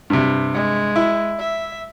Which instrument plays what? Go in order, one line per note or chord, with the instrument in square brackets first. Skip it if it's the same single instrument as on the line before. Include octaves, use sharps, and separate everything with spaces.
[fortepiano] G2 C3
[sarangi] G#3
[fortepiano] E4
[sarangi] E5